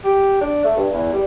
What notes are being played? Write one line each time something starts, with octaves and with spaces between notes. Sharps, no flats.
G4
D4
A3
G2
E2
G3